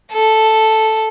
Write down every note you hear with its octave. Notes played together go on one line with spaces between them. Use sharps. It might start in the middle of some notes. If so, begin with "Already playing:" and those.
A4